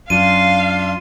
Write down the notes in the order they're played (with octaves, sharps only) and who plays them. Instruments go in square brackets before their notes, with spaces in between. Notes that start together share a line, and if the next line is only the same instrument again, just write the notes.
[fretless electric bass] F#2 [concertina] D4 F4 C6 [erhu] F5 [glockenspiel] D#7